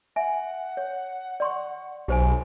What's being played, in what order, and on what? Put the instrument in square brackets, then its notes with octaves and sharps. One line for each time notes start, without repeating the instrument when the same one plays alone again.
[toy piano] E5 G#5 [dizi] F#5
[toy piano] C#5
D5 C6 C#6
[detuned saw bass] B1 [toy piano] G4 C5 G#5